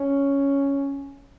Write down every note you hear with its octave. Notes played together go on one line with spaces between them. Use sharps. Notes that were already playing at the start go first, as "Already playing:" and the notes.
Already playing: C#4